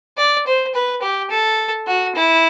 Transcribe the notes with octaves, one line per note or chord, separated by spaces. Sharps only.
D5
C5
B4
G4
A4
F#4
E4